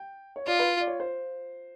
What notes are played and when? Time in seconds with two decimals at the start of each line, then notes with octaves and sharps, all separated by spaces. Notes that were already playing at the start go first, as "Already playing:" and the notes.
Already playing: G5
0.36 C#5
0.47 F4 D5
0.59 B4
0.80 D5
0.87 C#5
1.00 C5